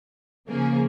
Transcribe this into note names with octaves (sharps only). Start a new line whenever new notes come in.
C#3 F3 A#3 C#4 G#4